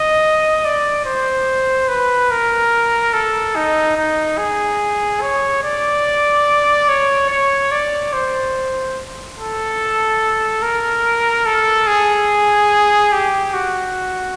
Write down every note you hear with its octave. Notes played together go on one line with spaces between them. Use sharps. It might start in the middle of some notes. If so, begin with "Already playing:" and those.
Already playing: D#5
D5
C5
B4
A#4
A4
D#4
D#4
G#4
C#5
D5
C#5
C#5
D5
C5
A4
A#4
A4
G#4
G4
F#4